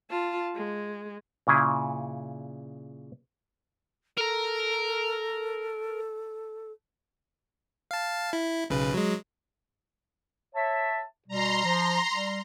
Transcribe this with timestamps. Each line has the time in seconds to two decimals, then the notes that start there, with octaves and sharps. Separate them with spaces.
0.10 F4 A5
0.55 G#3
1.47 A#2 C#3 E4 G#4
4.18 A4 A#4 A#5
7.91 F5 A5
8.33 E4
8.70 B1 C#3 B4
8.94 F#3 G#3
10.55 C#5 E5 A5
11.28 B2 G3 A#5 C6
11.64 F3
12.11 G3